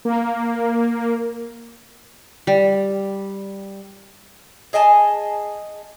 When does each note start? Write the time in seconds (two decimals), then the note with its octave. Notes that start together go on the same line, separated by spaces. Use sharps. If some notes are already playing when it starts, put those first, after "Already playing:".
0.05 A#3
2.47 G3
4.73 G#4 D#5 G#5 A5